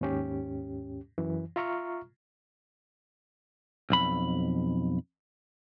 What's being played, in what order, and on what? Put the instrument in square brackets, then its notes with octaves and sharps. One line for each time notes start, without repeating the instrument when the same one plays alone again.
[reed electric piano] D#2 G#2 C#4 G4
F#2 E3
F4 E5 A#5 C#6 F6
[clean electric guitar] B1 F2 B5